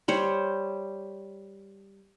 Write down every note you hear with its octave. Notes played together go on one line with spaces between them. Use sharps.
G3 C5 C#5